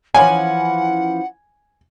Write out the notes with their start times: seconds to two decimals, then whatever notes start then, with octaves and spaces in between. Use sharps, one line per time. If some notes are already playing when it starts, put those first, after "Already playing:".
0.14 E3 F3 C#4 F#5 G#5